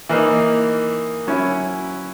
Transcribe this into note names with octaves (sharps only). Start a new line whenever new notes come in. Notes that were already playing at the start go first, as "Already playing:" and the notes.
E3 A#3 D#4
F#3 C#4 E4